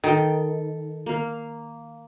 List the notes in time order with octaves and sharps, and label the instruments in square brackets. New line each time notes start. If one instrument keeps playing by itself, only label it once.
[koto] D#3 [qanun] A4 G5
[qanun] A#3 F5